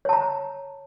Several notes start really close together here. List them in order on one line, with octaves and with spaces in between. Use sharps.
C#5 A5 A#5